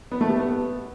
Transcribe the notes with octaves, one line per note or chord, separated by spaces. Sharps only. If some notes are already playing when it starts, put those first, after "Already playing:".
B3
A3
G4
B3